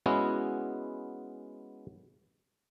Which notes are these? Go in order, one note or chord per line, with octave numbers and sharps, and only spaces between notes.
G#3 B3 C#4 E4 F#4